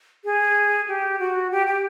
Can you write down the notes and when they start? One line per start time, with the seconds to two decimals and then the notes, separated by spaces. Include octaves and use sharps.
0.25 G#4
0.88 G4
1.19 F#4
1.51 G4
1.67 G4